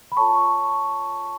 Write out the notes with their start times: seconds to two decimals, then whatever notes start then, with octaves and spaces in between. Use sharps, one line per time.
0.12 B5
0.17 F4 A4 C#5 A5 C#6